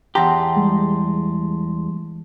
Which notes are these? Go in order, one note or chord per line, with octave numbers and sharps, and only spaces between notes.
E2 G4 F#5 A5 A#5 C6 A#6
G3 G#3